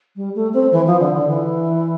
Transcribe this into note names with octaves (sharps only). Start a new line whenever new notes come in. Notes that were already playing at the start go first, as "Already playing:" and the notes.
G3
A3
C4
E3
F3
D3
D3
E3